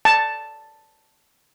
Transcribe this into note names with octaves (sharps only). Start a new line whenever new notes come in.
A5